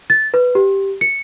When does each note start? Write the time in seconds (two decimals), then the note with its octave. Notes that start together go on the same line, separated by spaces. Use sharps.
0.10 A6
0.34 B4
0.55 G4
1.01 C#7